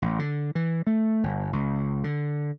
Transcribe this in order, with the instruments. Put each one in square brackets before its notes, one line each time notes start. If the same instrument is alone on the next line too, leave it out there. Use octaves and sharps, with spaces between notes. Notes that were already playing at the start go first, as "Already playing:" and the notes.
[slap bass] A1
D3
E3
A3
G1
C#2
D3